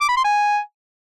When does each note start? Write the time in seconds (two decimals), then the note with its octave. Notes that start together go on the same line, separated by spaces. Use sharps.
0.01 D6
0.09 B5
0.17 C6
0.25 G#5